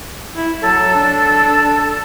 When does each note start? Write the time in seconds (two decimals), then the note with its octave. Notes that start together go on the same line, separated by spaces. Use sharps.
0.36 E4
0.62 F#3 A4
0.95 D4